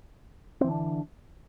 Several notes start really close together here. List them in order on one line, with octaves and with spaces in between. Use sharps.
C4 E3 D3 D4